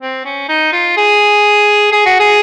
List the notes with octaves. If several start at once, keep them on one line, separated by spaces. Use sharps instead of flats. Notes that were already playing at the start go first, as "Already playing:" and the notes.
C4
C#4
D#4
F4
G#4
G#4
F#4
G#4